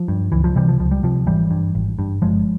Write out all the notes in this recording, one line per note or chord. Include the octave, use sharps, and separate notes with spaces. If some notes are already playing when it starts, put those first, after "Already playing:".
Already playing: F3
G2
C#2 E3
F3
C3 E3 G3
F3
C#2 F3
G3
C3 F3
G#1 E3 G3
G2
G#1
G2
G1 F3 G#3